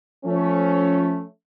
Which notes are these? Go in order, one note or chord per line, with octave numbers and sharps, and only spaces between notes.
F3 A3 C#4